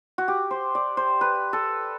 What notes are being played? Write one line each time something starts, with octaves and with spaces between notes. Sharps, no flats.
F#4
G4
C5
D5
C5
B4
A4